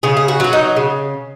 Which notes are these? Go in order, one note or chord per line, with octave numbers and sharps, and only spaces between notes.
C#3 G#4
G#4
F#4
F#3 F#4
D#4
C#3